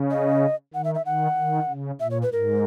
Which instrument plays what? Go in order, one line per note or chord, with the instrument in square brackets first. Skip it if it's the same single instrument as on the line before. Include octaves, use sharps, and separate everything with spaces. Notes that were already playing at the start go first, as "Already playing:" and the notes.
Already playing: [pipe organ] C#3
[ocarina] D#5
[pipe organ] D#3 [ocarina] F#5
[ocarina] E5
E5
[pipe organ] D#3 [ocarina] F#5
[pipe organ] D#3
C#3
[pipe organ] A#2 [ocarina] E5
[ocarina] C#5
B4
[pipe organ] G#2 [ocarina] A#4